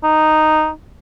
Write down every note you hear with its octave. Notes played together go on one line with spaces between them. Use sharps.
D#4